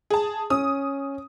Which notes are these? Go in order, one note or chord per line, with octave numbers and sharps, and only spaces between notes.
G#4 A5
C#4 D#6